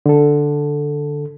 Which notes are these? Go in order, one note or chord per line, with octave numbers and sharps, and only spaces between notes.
D3 A4